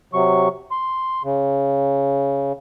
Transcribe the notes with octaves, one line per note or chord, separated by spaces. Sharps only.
C3 F#3 C#6
C6
C#3